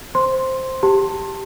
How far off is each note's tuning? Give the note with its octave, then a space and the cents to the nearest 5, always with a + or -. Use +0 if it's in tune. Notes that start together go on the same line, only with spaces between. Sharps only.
C5 +0 C6 +0
G4 +0 A5 +20